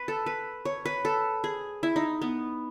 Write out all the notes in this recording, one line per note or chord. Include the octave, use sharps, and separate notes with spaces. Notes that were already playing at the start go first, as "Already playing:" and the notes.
Already playing: B4
A4
B4
C#5
B4
A4
G#4
E4
D#4
B3